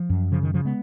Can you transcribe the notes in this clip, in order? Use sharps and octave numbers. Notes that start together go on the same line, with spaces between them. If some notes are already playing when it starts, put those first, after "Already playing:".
Already playing: F3
F#2
C#3 F3
D#3
C#3 F3
G#3 B3